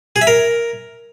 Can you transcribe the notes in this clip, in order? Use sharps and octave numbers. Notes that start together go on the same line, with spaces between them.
G#4
E5
A#4